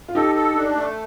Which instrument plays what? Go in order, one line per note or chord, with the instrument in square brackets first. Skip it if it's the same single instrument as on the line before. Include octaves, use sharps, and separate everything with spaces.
[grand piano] F4
[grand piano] D#4 G4 [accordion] A4
[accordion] A4
D4
A3